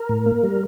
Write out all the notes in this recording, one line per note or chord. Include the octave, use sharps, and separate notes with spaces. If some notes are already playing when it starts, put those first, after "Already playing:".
Already playing: A#4
A2
A#3
G3